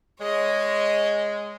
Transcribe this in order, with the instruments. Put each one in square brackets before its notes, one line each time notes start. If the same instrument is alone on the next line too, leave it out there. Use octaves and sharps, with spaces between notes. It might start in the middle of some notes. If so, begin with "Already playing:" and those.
[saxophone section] G#3 [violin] C#5 D#5